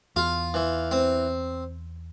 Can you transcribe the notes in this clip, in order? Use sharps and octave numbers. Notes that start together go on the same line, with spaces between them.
E2 F4
E3
C4